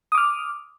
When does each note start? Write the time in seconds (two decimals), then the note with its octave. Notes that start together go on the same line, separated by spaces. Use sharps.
0.12 D#6
0.15 D6
0.18 F6